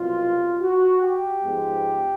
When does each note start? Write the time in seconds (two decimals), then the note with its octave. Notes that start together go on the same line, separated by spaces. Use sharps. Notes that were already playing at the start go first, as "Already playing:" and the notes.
Already playing: C2 B2 F#3 F4
0.62 F#4
1.02 G4
1.43 G#2 F3 G#3 B3